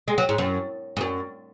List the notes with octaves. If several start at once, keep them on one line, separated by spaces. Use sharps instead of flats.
G#3
F#3
G#2
F#2
G#2
F#2